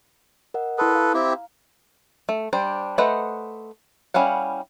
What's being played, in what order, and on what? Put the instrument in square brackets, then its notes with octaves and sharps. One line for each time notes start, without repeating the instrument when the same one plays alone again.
[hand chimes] A#4 D#5 F#5
[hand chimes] E4 C6 D#6 [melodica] A4 B4
[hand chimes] F5 A#5
[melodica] C4 E4 G4
[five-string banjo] A3
G3 D4 C5
A3 B4 C5 D#5 F#5
G3 C#4 E4 F5 F#5